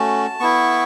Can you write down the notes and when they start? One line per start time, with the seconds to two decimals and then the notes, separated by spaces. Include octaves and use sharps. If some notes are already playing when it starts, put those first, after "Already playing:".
Already playing: A3 C#4 F#4 A5
0.40 B3 E4 C#6